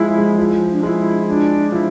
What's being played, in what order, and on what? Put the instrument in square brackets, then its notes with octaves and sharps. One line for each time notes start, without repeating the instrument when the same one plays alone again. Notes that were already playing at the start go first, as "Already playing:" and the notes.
Already playing: [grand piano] F3 G#3 [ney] E4
[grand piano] G#3
F3
[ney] D4
[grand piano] G#3 [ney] E4 F4
[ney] D4
[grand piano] F3 [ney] E4